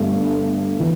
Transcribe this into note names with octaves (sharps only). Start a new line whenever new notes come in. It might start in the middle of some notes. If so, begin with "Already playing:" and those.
Already playing: G1 G2 A3
E3